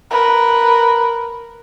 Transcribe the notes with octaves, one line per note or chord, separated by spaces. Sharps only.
A#4 B4